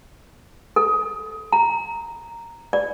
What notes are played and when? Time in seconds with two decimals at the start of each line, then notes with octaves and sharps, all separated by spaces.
0.76 A4
1.52 A#5
2.73 D5